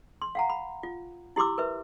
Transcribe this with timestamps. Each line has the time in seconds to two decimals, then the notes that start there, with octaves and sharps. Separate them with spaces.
0.22 C6
0.35 F5 F#5 A#5
0.50 B5
0.83 F4
1.36 E4 G4 C6 D6 E6
1.58 A#4 B4 E5